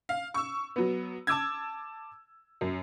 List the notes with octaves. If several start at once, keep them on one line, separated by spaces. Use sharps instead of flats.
F5
C#6 E6
F#3 B3
A5 D6 E6 G#6
F#2